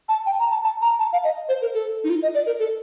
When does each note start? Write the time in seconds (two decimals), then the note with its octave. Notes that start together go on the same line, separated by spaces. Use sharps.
0.09 A5
0.26 G5
0.39 A#5
0.51 A5
0.64 A5
0.82 A#5
0.99 A5
1.13 F5
1.24 D#5
1.49 C5
1.62 A#4
1.74 A4
2.04 D#4
2.10 F4
2.22 D#5
2.34 D5
2.46 A#4
2.59 A4